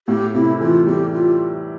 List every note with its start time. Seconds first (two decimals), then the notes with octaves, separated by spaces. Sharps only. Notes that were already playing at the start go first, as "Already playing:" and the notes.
0.08 A2 G4
0.34 C3 E4
0.61 E3 F4
0.87 G3 G4
1.13 F4